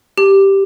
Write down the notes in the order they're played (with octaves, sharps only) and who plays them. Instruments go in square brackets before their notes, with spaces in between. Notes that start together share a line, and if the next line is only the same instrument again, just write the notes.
[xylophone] G4